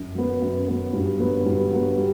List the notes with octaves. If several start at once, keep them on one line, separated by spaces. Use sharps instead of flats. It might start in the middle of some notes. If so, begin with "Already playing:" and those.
Already playing: F#2
F#3 B3
F#2
F#3 B3
G2
F#3 B3
G2
F#3 B3
G3